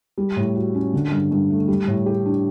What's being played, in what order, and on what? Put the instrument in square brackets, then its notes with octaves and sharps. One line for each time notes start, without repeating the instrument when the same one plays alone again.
[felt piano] G3
A2
F#4
C#4
D3
G2
G2
A3
G3
A2
G4
D4